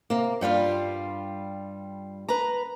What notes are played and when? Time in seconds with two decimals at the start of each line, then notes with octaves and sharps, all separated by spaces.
0.10 C3 A#3
0.41 G2 G3 F4 F5
2.29 B4 A#5